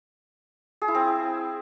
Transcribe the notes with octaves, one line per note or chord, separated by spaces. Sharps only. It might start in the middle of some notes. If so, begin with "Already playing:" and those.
G#4
E4
C4